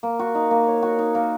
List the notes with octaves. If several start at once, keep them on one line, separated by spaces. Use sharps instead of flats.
A#3
F#4
D#4
A#3
C#5
F#4
D#4
A#3